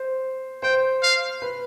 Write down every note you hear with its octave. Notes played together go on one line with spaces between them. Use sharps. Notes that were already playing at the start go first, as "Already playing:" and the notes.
Already playing: C5
C5 G5
F5
B4